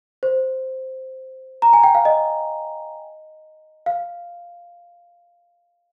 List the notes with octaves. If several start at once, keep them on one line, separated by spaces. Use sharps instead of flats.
C5
A#5
G#5
G5
F5
D#5
F5